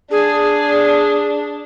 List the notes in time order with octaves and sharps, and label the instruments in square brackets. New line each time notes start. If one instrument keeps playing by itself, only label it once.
[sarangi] D4 [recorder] G#4